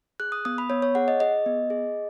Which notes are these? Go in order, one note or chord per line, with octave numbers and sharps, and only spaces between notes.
G#4 F#6
D#6
B3 D#6
B5
B3 C#5
C#5
G#4 F#5
D#5
G#4 D#5
B3
G#4